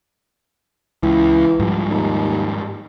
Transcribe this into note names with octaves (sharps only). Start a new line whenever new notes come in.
C#2 E3
G#2 F3 G3
D#2